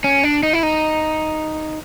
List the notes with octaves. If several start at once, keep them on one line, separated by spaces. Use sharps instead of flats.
C#4
D4
D#4
E4
D#4